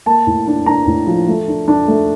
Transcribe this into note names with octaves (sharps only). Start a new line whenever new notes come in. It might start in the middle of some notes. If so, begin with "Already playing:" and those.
A#3 A5
A2
D4
D4 A#5
A2
F3
A3
D4
D4
A3